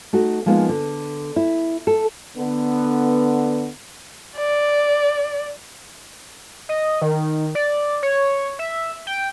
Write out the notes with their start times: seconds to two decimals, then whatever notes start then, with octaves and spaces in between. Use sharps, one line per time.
0.13 A3 D#4 F#4
0.46 F3 G#3 A#3 B3 D4 D#4
0.69 D3
1.36 E4
1.87 A4
2.35 D3 B3
4.37 D5
6.69 D#5
7.02 D#3
7.55 D5
8.03 C#5
8.59 E5
9.07 G5